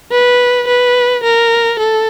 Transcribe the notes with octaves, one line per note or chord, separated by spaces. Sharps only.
B4
B4
A#4
A4